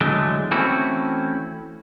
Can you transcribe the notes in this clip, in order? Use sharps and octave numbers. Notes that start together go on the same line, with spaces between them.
E2 D3 E3 F#3 G#3 A3
E3 A3 C4 C#4 E4 F#4